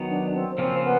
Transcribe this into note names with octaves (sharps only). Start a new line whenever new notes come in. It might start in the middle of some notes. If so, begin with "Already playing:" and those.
Already playing: D#3 F#3 B3
D4
C4
C#3 F3 A#3 C4 C#4 F4
B3